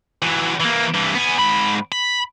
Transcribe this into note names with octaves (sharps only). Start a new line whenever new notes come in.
E3 F#3
E3 A#3
G2 E3
B3 G#5
G#2 B5
B5